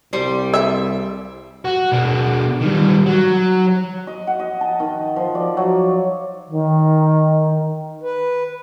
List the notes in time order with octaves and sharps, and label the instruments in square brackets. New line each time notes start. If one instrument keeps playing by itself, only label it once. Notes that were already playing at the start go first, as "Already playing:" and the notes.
[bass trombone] C2 [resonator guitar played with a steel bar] G3 C5
[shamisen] E5
[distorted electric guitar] F#4
B2 D4
D#3 G3
F#3
[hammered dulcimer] D#5
F#5
D#5
A5
D#3
F3
D5
F#3
[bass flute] D#3
[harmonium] B4